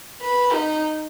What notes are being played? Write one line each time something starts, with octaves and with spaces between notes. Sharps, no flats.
B4
D#4